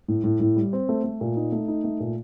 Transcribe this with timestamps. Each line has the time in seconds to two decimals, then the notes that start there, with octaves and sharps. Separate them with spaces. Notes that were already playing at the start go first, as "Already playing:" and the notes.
0.08 A2
0.24 A2
0.40 A2
0.56 G3
0.73 C4
0.89 A3
1.04 A3
1.21 A#2
1.36 D#4
1.52 A3
1.68 D#4
1.84 A3
2.00 A#2